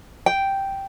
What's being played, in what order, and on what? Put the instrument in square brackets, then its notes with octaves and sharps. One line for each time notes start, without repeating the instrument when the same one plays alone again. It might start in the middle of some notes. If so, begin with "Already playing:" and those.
[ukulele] G5